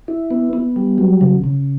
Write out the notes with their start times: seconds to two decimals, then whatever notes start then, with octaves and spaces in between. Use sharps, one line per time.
0.08 E4
0.31 B3
0.53 B3
0.76 G3
0.98 F#3
1.21 C#3
1.44 C#3